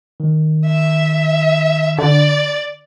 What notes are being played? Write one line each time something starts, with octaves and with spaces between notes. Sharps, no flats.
D#3
E5
D3 D5